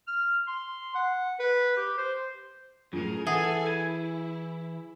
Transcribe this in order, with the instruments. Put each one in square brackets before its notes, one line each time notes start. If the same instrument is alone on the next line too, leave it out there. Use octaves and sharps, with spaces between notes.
[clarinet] F6
C6
F#5
B4
G4
C5
[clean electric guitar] F#2 A2 [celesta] F4 [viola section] G#4 A#4
[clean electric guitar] E3 [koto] G#4 [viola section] A4 G#5 [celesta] E5 F#5
[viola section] E4 [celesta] G#6 D#7